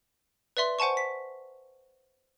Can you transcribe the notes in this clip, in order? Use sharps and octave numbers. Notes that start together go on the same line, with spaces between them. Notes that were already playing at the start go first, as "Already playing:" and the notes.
B4 D5 E5 C6
C5 F#5 G#5 A5 C#6
B6